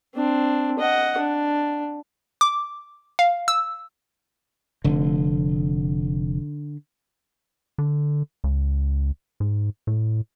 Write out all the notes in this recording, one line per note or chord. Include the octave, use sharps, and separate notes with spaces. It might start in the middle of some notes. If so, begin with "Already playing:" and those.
C4 D4
D#5 F#5
D4
D6
F5
E6
F1 D3
D3
C#2
G#2
A2